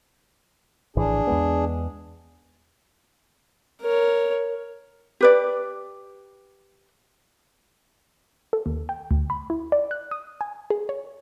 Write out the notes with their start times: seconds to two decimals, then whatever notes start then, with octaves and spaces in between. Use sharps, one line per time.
0.96 A#1 A2 E3 D4 G#4
1.27 E2 G#3 B3
3.81 A#4 C#5
5.21 G4 B4 D5
8.53 A4
8.66 D#2
8.89 G5
9.11 D2
9.30 B5
9.50 E4
9.72 D5
9.91 F#6
10.11 D#6
10.41 G#5
10.70 G#4
10.89 C#5